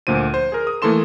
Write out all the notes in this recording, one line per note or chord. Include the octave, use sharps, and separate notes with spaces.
D2 A#2 F3 C5 D#7
C5
G#4 A#4
D#6
E3 A3 A#3 A4 C6 E7